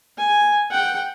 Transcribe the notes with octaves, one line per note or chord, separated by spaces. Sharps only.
G#5
F#5 G5